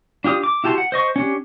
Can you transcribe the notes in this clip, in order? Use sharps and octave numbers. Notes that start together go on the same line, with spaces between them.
D4 F4 G4 D#6
D6
E4 F#4 G4 A5 C6
F#5
C5 D#5 C#6
C#4 D4 G4